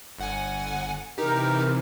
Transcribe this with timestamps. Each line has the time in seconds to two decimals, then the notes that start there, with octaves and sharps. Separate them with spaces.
0.19 G1 F#5 G#5
1.18 C3 E3 D#4 G4 A#4